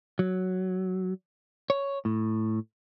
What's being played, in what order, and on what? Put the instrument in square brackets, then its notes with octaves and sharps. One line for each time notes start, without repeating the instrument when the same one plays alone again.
[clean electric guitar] F#3
C#5
A2